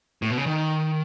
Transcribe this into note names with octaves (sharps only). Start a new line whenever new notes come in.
A2
B2
C#3
D#3